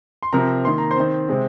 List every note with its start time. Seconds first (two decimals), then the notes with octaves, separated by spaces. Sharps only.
0.23 C6
0.33 C3 F3 C4 A#4 A#5
0.65 D#3 A#3 C6
0.78 A#5
0.91 C5 C6
0.97 D#3 C4
1.28 C3 G#3 C4